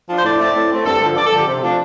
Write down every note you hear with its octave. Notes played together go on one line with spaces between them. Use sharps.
F3 D4
C5
A2 D5
A3 C4
A2
A3 C4
G2 A4
D3 F3
G2 D5
A4
D3 F3 G4
C3
F3 A3 D4